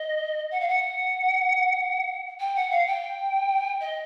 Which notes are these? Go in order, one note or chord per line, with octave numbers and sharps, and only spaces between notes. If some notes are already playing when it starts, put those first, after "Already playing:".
Already playing: D#5
F#5
F5
F#5
G5
F#5
F5
G5
D#5